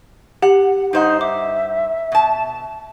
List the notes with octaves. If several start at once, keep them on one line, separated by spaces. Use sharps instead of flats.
G4 F#5
G2 D#4 C5 F#5
E5 D6
B2 A5